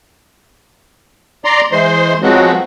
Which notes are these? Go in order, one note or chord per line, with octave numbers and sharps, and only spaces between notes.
D5 A#5 C6
E3 G#3 C5 C6
F3 F#3 G#3 B3 C4 F#4